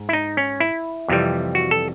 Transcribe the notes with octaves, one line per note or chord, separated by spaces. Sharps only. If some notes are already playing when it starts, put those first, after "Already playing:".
Already playing: G#2
E4
D#4
C#4
E4
F2 C3 E3 G3
F#4
A4